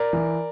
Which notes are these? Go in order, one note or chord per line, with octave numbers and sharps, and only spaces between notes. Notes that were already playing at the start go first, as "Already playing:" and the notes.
Already playing: A#4 D5
E3